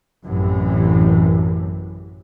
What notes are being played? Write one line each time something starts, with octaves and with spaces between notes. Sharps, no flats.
A1 F#2 A2 C3 E3